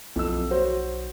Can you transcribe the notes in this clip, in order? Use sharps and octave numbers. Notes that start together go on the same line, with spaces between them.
B1 F2 E6
F#4 C5 C#5